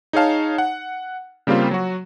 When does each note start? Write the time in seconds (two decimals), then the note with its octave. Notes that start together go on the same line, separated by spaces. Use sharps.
0.13 D#4 G#4 C#5 F5 A5
0.58 F#5
1.47 C#3 G3 A#3 C4 F4
1.71 F#3 F#4